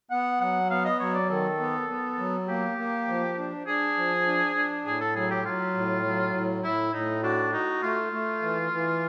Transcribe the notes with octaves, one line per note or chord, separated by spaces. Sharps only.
B3 F#5
F#3 F#5
B3 F5
D#5
F#3 C#5
D5
D#3 A4
B3
B3
F#3
A#3 G4
A#3
F3
D4
D4 G#4
F3
D4
D4
A2 G#4
A4
F#3 G#4
G4
F#3 F4
A2
F#3
A2
A2 E4
A2 D#4
D4 F#4
D#4 F#4
A3 F4
A3
E3
E3